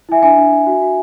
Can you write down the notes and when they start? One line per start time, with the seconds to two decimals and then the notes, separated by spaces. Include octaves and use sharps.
0.09 E4 E5 G#5
0.22 D4 E5 G#5
0.37 D4
0.52 D4
0.67 F#4
0.82 F#4